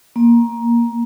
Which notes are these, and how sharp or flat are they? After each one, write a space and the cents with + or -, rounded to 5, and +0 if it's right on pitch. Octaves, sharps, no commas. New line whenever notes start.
A#3 +15